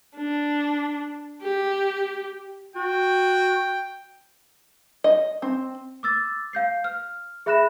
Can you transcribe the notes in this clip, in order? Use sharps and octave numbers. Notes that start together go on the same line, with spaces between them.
D4
G4
F#4 G5
D#5
C4
D6 E6 A6
F5 G6 C7
F6
G#4 E5 B5 F#6 A#6 E7